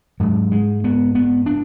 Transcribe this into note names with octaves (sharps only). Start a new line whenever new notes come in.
G#2 F#3
G#3
B3
B3
D4